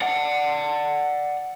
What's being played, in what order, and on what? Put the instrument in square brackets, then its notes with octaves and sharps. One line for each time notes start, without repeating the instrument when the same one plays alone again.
[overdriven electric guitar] D5 F#5